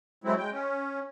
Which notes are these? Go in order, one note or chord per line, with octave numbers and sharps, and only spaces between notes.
F#3 G#3 A3 C4 E4
G#3 G5
C#4